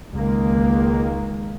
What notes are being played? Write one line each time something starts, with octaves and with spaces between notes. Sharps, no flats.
C#2 D#3 G#3 A#3